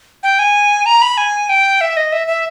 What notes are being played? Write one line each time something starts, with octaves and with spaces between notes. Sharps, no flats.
G5
G#5
A#5
B5
G#5
G5
E5
D#5
E5
E5